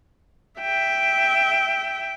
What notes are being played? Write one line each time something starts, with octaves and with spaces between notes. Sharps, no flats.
E5 G5